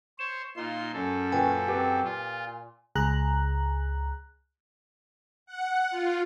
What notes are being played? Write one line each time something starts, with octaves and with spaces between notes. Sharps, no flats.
C5 C#5 E7
A#2 D#4 F4 C6
F#2 C#4 A4
A#2 B4 G5 G#5
C4 G4 B4
A#2 F4
C#2 G#4 A#5 F#6
F#5
F4